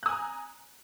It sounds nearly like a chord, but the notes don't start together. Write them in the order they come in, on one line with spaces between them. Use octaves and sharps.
F#6 D#6 G#5 A#5